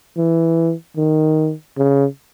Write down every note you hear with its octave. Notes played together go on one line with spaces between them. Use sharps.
E3
D#3
C#3